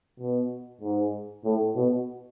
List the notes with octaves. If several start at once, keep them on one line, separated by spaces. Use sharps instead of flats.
B2
G#2
A2
B2